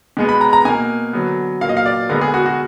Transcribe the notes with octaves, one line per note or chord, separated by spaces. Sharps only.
B2 G#3 B3
B5
A#5
A#5
B2 A#3 G#5
D3 F#3 B3
A#2 F#3 A#3 F5
D#5
F5
D5
D3 G#3 B3 A#4
G#4
F#4
F#4